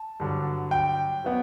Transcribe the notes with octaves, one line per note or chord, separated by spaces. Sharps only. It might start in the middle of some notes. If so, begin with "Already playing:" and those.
Already playing: A5
G2 D3 F#3
G5
F#3 B3